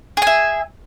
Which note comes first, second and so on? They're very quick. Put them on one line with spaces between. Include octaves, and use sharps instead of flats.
G#4 G#5 E5